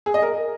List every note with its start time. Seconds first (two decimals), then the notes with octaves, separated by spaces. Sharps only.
0.06 G#4
0.14 D#5
0.22 A#4